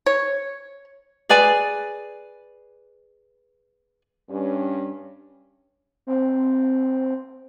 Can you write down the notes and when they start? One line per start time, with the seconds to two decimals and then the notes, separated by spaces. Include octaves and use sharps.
0.06 C#5
1.29 G#4 B4 D5 G#5
4.30 G2 C#4
6.07 C4